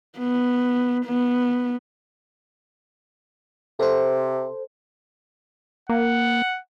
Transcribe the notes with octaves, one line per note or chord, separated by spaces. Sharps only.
B3
B3
C3 A4 C5
A#3 F#5